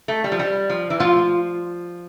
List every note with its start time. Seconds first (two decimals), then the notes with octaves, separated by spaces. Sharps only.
0.08 A3
0.24 G3
0.32 F3
0.39 G3
0.70 F3
0.90 E3
1.00 F3 F4